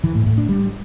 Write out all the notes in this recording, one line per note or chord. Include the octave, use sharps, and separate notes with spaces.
E3
A2
A2
D4
G3